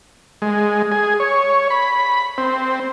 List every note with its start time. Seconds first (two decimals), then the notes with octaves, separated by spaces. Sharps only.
0.42 G#3
0.92 G#4
1.20 C#5
1.70 B5
2.38 C4